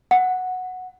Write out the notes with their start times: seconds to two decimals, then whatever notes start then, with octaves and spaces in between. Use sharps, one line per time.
0.11 F#5